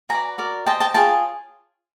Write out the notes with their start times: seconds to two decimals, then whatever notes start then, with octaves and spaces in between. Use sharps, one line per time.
0.09 F#4 G#5 A#5
0.13 B4 D5
0.38 F#4 A#4 D5
0.66 G4 C5 D#5 G5 A5
0.80 G5 A5
0.94 F4 G#4 C#5 G5 A5